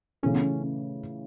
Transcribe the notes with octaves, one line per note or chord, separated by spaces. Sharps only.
C#3 E3 A3 C#4
B3
C#4